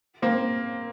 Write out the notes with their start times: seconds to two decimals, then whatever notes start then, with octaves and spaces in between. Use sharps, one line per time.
0.22 A#3 C4